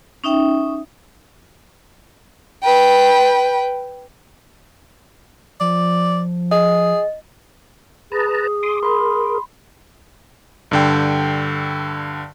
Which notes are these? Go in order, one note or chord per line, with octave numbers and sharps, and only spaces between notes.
C#4 D#4 E5 G5
B4 G5
F3 D5
G#4 D#5
G#4 B4 A5 A#5
C6 D6 D#6
A#4 B5 C6
G2 D3 G5